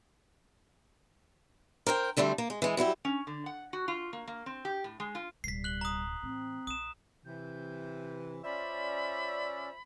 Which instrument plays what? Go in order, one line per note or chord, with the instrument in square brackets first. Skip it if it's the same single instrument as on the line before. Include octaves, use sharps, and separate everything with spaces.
[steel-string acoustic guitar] A#4 C5 D#5 G5
D2 D3 G3 A3 C4
A#3
G#3
E3 G#3
F#3 G3 E4 G4
[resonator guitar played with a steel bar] C#4
D3
F#5
F#4
F4
A#3
A#3
C4
G4
A2
G#3
F4
[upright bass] D1 B2 [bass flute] G3 [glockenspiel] B6 C7
[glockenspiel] F#6 F#7 G7
A#5 D#6
[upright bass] A2 E3 [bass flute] C4
[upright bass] A#1 [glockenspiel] D#6 E7
[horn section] C3 E3 [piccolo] G6
[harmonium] C#4 D5 [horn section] F4 C5 E5 [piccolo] B5